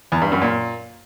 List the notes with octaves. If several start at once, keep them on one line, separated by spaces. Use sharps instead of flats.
E2
G2
F#2
A#2